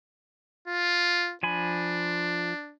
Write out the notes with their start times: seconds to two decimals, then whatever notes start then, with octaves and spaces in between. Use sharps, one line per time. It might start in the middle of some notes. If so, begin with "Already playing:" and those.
0.67 F4
1.43 F3 D4 G#5 B5